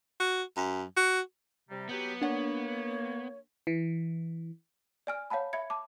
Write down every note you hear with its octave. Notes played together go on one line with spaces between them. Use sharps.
F#4
F#2
F#4
C3 G3 A#5
F#3 B3 G4
A#3 D4 C#5 F#5
E3
D5 G#5 F6
C#5 F5 F#5 A5 B5
E5 B5 G#6 C#7
A5 D6